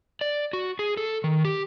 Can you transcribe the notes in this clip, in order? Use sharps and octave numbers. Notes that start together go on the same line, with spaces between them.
D5
F#4
G#4
A4
D#3
G4